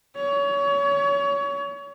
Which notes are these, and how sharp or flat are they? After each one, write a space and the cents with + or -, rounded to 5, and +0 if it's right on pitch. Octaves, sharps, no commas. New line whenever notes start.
C#5 +30